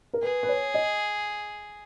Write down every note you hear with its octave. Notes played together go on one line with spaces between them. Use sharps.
A#4
G#4 B4
B4
C#5
D#5